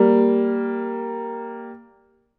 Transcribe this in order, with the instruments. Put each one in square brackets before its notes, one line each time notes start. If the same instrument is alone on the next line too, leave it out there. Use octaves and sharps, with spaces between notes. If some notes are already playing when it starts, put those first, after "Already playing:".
Already playing: [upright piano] G3 A#3